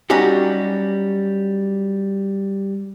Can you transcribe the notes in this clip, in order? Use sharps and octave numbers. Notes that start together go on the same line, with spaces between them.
F#3 G3 C#4 D#4 F#4 G4